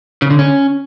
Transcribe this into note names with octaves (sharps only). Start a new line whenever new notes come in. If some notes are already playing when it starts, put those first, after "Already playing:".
C#3
D3
C#4